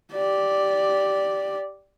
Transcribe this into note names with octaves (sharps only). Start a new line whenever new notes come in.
G4 D5